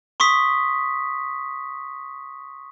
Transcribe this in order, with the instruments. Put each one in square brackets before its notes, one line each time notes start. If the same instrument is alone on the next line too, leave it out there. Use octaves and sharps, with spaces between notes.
[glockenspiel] C6 C#6 D#6 B6